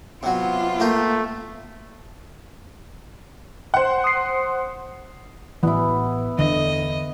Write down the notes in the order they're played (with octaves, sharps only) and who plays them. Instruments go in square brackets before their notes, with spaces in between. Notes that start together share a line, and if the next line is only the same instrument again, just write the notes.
[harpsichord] C3 F#3 [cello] B3 F4
[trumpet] A3 [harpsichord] A#3 G4
[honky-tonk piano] C5 F#5
[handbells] D#6 C7
[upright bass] A1 [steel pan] E3 [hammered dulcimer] B3 E4
[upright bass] E2 [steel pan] D3 [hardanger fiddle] D#5